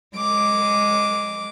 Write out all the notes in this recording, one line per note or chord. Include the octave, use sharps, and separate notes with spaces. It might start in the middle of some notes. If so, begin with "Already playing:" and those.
G#3 D6